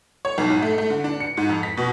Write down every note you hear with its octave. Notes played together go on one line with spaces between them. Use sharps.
C#5
B1
G#2
A3
A3
D3
D4
C#7
G#2
F2
B6
B2